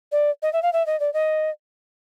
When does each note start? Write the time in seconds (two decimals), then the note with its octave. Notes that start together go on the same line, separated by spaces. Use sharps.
0.12 D5
0.42 D#5
0.53 E5
0.62 F5
0.73 E5
0.86 D#5
1.00 D5
1.14 D#5